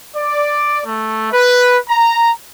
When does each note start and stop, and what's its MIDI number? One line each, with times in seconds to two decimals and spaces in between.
0.15 0.80 74
0.85 1.29 57
1.33 1.77 71
1.88 2.31 82